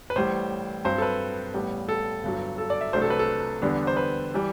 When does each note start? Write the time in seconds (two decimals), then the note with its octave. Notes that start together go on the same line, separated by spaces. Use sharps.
0.10 B4
0.16 A1 A2 G3 C5
0.85 G2 F#3 C4 C5
0.98 A4
1.02 B4
1.54 A1 A2 G3 B3
1.89 A4
2.23 G1 G2 F#3
2.58 A4
2.70 D5
2.81 E5
2.93 C2 C3 F#3 A3 D4 C5
3.02 A4
3.10 B4
3.19 A4
3.62 E2 D3 G3 B3 D4
3.87 C5
3.97 B4
4.34 E3 G3